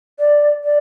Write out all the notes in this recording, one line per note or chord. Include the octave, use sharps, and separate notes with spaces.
D5
D5